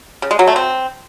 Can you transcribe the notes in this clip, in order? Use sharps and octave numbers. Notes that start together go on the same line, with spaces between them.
C#3
G#3
F#3
A3
C4